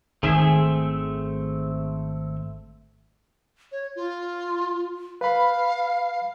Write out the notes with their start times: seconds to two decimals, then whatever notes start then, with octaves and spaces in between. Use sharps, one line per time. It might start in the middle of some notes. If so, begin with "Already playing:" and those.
0.23 G#1 D#3 A3 C4 G#4 E5
3.72 C#5
3.96 F4
5.21 B4 F5 B5